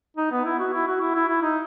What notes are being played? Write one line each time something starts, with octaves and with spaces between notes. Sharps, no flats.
D#4
B3
E4
F#4
E4
F#4
E4
E4
E4
D#4